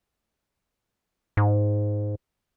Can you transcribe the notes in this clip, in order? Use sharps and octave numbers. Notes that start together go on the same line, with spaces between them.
G#2